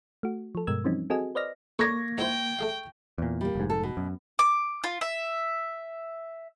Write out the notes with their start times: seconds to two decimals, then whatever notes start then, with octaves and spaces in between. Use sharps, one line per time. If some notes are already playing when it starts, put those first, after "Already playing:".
0.23 A3 F#4
0.55 F3 A4
0.67 G2 B2 G#3 A#4 E6 G#6
0.84 E3 F3 G3 C4 C#4 D#4
1.10 C4 F#4 G#4 A4 D#5 G#5
1.35 B4 C5 D5 D#5 F6 A#6
1.79 A#3 A4 C#5 D5 C#6 G#6 A#6
2.18 G#2 E4 C5 G5
2.59 A3 G#4 F5
3.18 E2 A#2
3.41 G3 A#3
3.55 F1 G#2
3.70 A4
3.83 B2
3.97 F#2
4.39 D6
4.84 F4
5.01 E5